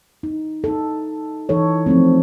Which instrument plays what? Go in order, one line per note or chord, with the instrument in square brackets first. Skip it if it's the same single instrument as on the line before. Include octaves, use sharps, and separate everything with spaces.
[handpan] D#4
D#4 A4
E3 D#4 A4 C#5
F3 A3 C4